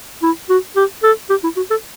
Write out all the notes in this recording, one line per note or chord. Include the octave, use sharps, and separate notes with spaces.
E4
F#4
G4
A4
G4
E4
F#4
A4